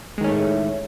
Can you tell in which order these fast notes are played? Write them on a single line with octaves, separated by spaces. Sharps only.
G#3 D#3 C#4 A3 A2